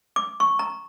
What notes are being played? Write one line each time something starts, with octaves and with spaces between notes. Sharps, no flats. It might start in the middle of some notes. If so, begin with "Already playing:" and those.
D6
C#6
A#5